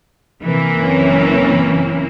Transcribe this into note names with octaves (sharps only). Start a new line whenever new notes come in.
C3 E3 A#3
F#1 C4 C#4